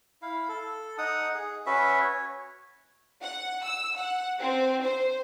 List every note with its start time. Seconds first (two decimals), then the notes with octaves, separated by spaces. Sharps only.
0.22 E4 F5
0.49 A4
0.98 D#4 F#5 D#6
1.34 G#4
1.66 C#4 F#4 B4 E5
2.00 C#5
3.23 F#5
3.64 E6
3.97 F#5
4.41 C4
4.83 C5